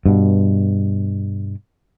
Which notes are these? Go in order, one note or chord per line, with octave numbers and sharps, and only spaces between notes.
G2 B2